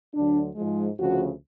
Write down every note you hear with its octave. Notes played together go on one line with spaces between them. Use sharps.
D2 D3 F#3 D4
G#2 F3 G#3
D2 C#3 F3 F#4